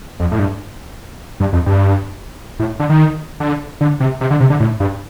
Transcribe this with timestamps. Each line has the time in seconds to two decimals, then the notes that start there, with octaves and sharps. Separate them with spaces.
0.20 F2
0.31 A2
0.39 G2
1.40 G2
1.53 F2
1.66 G2
2.60 A2
2.80 D3
2.89 D#3
3.40 D3
3.81 D3
4.00 C3
4.21 C3
4.31 D3
4.40 C3
4.50 D3
4.60 A2
4.80 G2